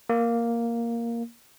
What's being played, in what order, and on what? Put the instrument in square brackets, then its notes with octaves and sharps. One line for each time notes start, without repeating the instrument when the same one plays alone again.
[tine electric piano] A#3